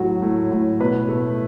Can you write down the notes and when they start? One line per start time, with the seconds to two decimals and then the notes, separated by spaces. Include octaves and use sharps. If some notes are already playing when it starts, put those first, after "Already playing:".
Already playing: A2 F#3 F#4
0.22 A2
0.51 A2
0.80 B2 B4
1.09 A3